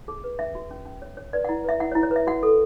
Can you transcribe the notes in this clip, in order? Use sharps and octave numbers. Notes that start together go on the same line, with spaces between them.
G#4
B4
C#4 E5
F#4
C#4
C#4
C#5
C#5
B4 D5
E4 F#5
B4 E5
E4 F#5
C#5
E4
C#5
B4 E5
F#4 F#5
A4